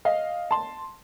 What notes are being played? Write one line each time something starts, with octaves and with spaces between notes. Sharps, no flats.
D#5 F5
A5 C6